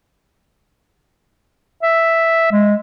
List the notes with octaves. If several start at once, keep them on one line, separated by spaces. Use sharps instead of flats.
E5
G#3